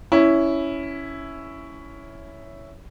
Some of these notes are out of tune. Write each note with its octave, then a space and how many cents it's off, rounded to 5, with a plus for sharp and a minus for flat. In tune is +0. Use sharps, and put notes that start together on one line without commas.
C#4 +10 E4 +0